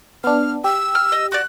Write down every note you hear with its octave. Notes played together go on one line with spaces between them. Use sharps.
B3 D4 F6
G4 E6
F6
D#5
F#4 D5 F#6